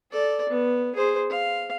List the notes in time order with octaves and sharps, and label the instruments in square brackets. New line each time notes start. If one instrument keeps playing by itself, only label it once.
[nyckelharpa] A4 D5
B3
G#4 C5
F5